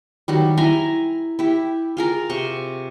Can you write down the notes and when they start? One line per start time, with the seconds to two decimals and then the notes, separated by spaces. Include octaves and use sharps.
0.28 D#3 F#3 G3
0.57 E4 G#5 A#5 C6
1.39 E4 G4
1.97 F4 G#4 A#4
2.29 C3 C6 C#6